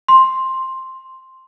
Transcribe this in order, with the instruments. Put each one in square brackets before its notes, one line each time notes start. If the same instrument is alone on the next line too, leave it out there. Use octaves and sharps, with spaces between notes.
[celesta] C6